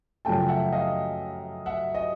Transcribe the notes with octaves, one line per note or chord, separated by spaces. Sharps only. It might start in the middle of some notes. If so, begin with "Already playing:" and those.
F#2 C#3 F3 A3 G5 A5
E5 F#5
D#5 F5
E5 F#5
D#5